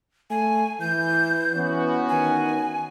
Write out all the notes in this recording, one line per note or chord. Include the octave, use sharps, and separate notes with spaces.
A3 G#5
E3 G6
E3 B3 C#4 F#4
D#3 G#5